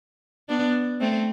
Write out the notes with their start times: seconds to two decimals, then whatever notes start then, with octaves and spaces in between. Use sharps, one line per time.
0.49 B3 D4
1.00 A3 C4